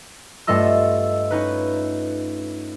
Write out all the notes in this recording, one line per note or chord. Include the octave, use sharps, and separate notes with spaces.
G2 A3 F4 D#5 E6
C#4 D#4 B4